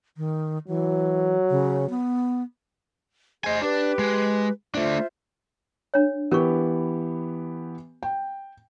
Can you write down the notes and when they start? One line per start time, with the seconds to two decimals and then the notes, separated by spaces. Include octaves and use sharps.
0.17 D#3
0.68 E3 F#3
1.50 C#3
1.90 B3
3.44 G#4 C5 D#5 G#5
3.62 D4 G4 B4
3.99 G#3
4.75 A3 D4 F4 C5 E5
5.94 D4 C#5
6.31 E3 B3 G4 A#4 C#6
8.03 G5